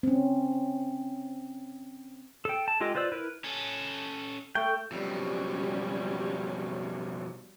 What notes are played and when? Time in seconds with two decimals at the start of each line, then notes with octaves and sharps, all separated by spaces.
0.03 C4 C#4
2.45 A4 G5
2.68 A5
2.81 G#3 F4 G4 A4 D#5
2.95 F4 B4 C5 D5 E6
3.12 E4 A#4 B4
3.44 C#4 A4
4.55 A3 G5
4.92 F2 B2 F#3 G3 C#4